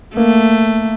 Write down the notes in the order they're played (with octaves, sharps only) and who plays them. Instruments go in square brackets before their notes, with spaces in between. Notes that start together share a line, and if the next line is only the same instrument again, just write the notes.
[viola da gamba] A3 [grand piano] A#3